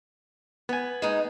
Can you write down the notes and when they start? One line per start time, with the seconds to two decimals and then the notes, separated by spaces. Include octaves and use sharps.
0.69 B3 B4 G#5
1.02 G#3 D#4